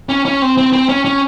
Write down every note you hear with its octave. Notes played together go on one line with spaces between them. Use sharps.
C#4
C#4
C4
C4
C4
C#4
C#4